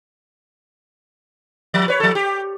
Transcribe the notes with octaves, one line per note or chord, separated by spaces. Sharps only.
F3
B4 C#5
F3 A4
G4